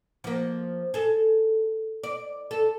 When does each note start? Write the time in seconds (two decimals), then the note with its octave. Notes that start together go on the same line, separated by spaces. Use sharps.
0.24 F3 A#3
0.94 G#4 A4
2.03 D5
2.51 A4